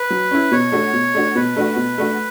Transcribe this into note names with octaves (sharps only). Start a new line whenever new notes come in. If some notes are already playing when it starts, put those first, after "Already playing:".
Already playing: B4
F#3
C#4 E4
B2 C#5
A3 D4 F#4
B2
A3 D4 F#4
B2 B4
A3 D4 F#4
B2
A3 D4 F#4